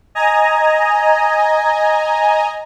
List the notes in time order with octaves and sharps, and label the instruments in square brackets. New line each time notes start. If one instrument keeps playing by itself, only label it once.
[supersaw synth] D#5 G#5 A#5